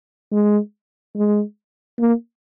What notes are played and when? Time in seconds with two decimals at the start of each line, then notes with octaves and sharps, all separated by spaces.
0.32 G#3
1.16 G#3
2.00 A#3